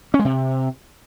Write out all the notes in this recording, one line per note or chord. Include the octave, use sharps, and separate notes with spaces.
C#4
G#3
C3